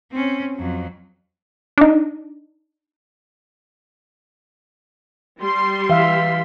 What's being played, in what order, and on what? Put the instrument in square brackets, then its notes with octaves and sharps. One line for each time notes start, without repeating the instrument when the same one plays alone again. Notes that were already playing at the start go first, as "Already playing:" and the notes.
[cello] C4 C#4
F2 F#3
[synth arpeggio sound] D4 D#4
[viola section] G3 C6
[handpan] E3 E5 F5